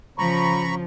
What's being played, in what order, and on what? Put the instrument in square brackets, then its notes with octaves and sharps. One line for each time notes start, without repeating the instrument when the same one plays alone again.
[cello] C#3 F3 [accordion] A#5 B5 C#6